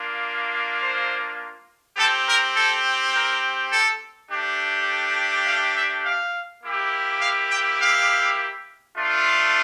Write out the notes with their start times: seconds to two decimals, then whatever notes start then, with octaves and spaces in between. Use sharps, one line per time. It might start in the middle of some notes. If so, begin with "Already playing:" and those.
Already playing: A#3 D4 F4
0.81 C5
1.97 C4 G4 A4
2.26 A#4
2.55 A4
3.14 A#4
3.71 A4
4.29 A3 D4 G4
5.47 F5
5.75 E5
6.04 F5
6.63 A#3 E4 G4
7.21 F5
7.50 G5
7.79 F5
8.95 A3 D4 F4